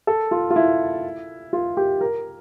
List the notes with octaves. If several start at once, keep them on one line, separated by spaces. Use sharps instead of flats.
A4
F4
F4
E4
F4
G4
A#4